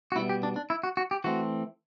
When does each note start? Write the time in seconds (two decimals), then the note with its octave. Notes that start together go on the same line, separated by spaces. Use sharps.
0.12 F#4
0.15 B2 G3 B3 E4
0.29 G4
0.43 D4
0.56 D4
0.70 E4
0.83 F#4
0.97 F#4
1.11 G4
1.24 E3 A3 C4 F#4